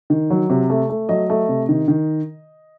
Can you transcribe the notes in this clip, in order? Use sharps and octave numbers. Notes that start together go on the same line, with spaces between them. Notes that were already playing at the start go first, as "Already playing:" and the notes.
D#3
F#3
C3
A3
A3
F#3 D#5
A3
C3
D#3
D#3